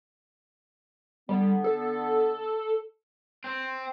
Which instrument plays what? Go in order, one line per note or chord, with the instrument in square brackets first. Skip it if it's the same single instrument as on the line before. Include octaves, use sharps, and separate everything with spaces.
[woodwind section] D3 B3 [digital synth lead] G3
[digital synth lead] A4
[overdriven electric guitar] C4